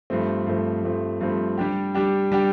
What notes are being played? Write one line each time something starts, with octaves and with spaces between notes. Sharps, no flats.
G2 F3 A3 C4
G2 F3 A3 C4
G2 F3 A3 C4
G2 F3 A3 C4
G3 D4 G4
G3 D4 G4
G3 D4 G4